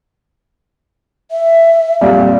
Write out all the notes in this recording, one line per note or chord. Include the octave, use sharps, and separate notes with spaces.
E5
F2 A#2 G3 F5